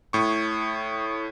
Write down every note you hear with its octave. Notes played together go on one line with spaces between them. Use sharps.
A2 C#6